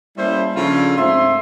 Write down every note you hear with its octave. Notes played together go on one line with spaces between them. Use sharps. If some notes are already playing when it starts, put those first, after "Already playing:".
G3 A#3 C#4 E4 A4 C5
C#3 F3 D4 F4 A4
G#2 A3 C4 E5 C6